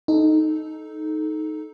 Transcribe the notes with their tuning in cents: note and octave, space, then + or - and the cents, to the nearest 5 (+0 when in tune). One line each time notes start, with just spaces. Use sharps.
D#4 +0 A4 -20